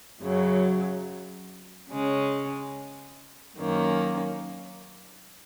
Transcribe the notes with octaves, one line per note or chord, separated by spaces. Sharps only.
F#2 C#3 F#3
C#3 G#3 C#4
F#2 D#3 A#3 C#4